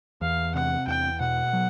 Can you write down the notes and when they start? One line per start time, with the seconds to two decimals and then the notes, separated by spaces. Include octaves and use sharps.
0.21 E2 F5
0.54 C3 F#5
0.87 E2 G5
1.20 B2 F#5
1.53 F#3